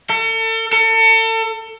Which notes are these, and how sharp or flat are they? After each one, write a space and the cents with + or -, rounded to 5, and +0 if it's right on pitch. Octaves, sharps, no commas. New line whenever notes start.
A4 +40
A4 +35